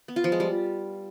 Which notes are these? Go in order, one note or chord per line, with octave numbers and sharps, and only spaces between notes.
B3
F4
F3
G#3
G3